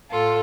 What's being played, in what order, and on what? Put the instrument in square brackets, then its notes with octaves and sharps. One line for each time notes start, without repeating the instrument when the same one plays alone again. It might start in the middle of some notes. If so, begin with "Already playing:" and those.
[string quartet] A2 F4 A4